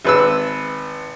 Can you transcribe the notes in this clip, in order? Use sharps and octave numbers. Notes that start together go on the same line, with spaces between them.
G#1 B4 E6